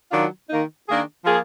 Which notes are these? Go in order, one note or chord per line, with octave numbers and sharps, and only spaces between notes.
D#3 F#3 D4 F4
D#3 A#3 D#4
D#3 A#3 D4 G#4
F3 A#3 F4 G#4